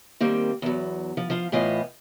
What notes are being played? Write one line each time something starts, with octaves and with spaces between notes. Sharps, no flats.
D#3 G3 A#3 C4
E2 F#3
F3
F3 F4
A2 E3 B3 F4 D#5